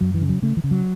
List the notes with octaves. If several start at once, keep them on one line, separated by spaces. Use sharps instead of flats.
F#2 F#3
E3
C#3
F#3
C#3 A3
E3
C#3
F#3